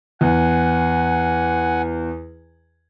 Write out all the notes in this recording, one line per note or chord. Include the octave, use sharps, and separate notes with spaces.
E2 F#5 G#5